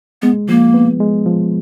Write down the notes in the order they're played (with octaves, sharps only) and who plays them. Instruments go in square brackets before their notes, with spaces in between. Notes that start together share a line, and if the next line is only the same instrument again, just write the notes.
[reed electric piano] G#3 [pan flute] B3
[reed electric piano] F3 [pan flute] A#3
[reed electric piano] B3
G#3
F3